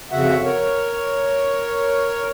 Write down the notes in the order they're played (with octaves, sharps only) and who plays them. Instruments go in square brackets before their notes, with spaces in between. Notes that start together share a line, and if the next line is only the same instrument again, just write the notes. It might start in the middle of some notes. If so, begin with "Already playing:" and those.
[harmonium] F2 C#3 F#4 E5 F#5
A#4 C#5